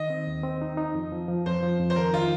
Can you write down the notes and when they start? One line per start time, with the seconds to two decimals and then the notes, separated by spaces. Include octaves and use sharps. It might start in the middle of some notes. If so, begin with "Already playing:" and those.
Already playing: D#3 D#5
0.10 C4
0.27 D#2
0.43 C4
0.62 D#4
0.77 D#4
0.95 F2
1.12 F3
1.28 F3
1.46 F2 C5
1.63 F3
1.80 F2
1.90 C5
1.96 D#3 A#4
2.13 D#3 F4